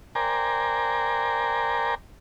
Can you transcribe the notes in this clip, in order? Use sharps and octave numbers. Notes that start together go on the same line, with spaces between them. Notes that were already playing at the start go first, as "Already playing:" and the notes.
A#4 C5 D5 G5 G#5 A#5